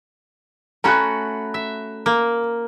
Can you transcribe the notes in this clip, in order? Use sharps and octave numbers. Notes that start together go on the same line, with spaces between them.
A3 C#4 F#4 A#5 B5 F#6
E5
A#3